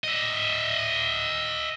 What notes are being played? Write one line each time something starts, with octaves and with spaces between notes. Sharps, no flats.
D#5 E5